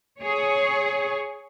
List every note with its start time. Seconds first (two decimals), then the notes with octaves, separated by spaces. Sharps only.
0.19 G#4 C#5